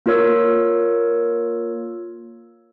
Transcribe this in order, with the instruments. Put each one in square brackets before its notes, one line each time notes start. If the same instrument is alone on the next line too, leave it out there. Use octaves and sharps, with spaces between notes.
[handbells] A#3 F4 A#4 C#5 E6